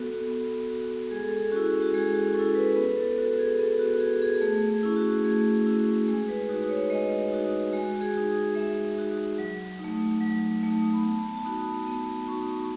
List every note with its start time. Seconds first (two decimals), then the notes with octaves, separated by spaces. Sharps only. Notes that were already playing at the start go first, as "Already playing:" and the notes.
Already playing: B3 F#4 A4
0.28 B3
0.70 F#4
1.11 G#3 G#4
1.23 A4
1.37 G#4
1.52 C#4 E4 F#4
1.82 F#4
1.94 G#3 G#4
2.15 F#4
2.35 C#4 A4
2.39 E4
2.55 B4
2.76 B3 B4
2.97 A4
3.18 F#4 A4
3.38 G#4
3.50 G#4
3.59 B3 A4
3.79 F#4
4.00 F#4 G#4
4.22 G#4
4.41 A3 G#4
4.69 G#4
4.83 C#4 E4
4.96 F#4
5.24 A3 G#4
5.66 C#4 E4 F#4
6.07 G#3 G#4
6.28 B4
6.49 D#4 F#4
6.65 B4
6.69 C#5
6.90 G#3 D#5
7.32 D#4 F#4
7.73 G#3 F#4
7.95 F#4
8.01 G#4
8.14 D#4 F#4
8.29 G#4
8.55 G#3 E5
8.97 D#4 F#4
9.38 F#3
9.79 A3 D#4
10.21 F#3
10.63 A3 D#4
10.93 B5
11.03 B3 A5
11.34 A5
11.45 D#4 F#4 B5
11.76 A5
11.87 B3 B5
12.28 D#4 F#4 C#6
12.60 C#6